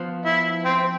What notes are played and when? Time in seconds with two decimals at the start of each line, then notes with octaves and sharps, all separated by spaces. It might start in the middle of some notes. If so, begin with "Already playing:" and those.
Already playing: F3 B3 F4 C5
0.26 E4
0.65 C4